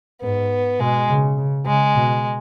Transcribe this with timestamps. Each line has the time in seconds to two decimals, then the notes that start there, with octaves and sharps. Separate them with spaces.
0.22 G#2 B3
0.80 B2 G#3
1.09 C#3
1.37 C#3
1.66 C#3 G#3
1.95 B2